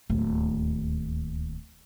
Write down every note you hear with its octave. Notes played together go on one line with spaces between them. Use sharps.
D1 D#2